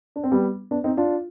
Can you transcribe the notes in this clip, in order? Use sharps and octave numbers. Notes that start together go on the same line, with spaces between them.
D4
C4
G3 B3
B3 D4
C4 D#4
D4 F4